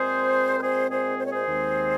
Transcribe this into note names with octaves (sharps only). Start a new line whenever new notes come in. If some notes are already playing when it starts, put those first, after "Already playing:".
Already playing: A#2 G#3 C4 G#4 C5
A#4
G#4 C5
G#4 C5
C5
C#5
G#4 C5
D#2 D#3 G#3 C4